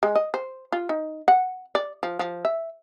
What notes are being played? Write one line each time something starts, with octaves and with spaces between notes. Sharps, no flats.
G#3
D#5
C5
F4
D#4
F#5
D5
F3
F3
E5